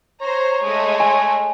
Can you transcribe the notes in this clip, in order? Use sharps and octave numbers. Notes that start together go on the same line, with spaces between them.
C5 C#5 A#5
G#3 A3
G#5